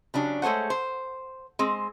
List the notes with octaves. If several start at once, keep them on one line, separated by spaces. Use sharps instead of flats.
C#3 F#3 D4 G4
G#3 A3 C5 C#5 F#5
C5
G#3 C4